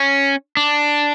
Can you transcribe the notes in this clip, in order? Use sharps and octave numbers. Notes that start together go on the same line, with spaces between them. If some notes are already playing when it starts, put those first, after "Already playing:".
Already playing: C#4
D4